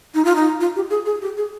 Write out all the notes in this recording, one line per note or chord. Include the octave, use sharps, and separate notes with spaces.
D#4
F4
D#4
F4
G4
G#4
G#4
G4
G#4